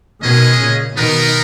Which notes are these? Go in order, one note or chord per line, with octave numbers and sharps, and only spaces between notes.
B2 D#3 G#3 C#4 G#4 D#5
A#2 C#3
B2 D#3 B3 D#4 A#4